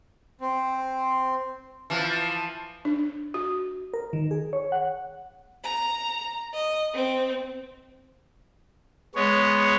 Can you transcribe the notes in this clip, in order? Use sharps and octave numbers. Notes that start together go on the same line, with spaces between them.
C4
E3 F3
D4
F#4
A#4
D#3
G#4
C#5
F#5
A#5
D#5
C4
G#3 B3 C#5